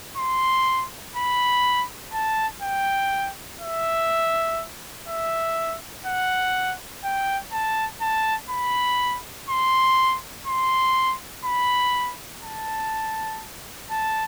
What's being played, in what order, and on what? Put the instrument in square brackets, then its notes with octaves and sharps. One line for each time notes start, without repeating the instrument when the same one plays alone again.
[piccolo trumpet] C6
B5
A5
G5
E5
E5
F#5
G5
A5
A5
B5
C6
C6
B5
A5
A5